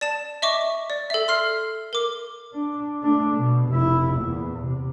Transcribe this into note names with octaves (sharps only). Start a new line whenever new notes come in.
D5 A5 E7
D#5 E5 C#6 D6
D5
A4 E5
C6 F6 C7
A#4 D6
D4
A3 D4
B2
F1 E4
E2 A#2
C3